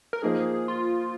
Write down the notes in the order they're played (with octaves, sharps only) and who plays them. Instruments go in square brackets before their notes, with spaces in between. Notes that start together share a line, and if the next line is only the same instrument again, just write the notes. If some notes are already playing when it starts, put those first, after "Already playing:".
[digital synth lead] A#4
[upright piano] F3 A#3 D#4 [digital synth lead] G#4
[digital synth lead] F4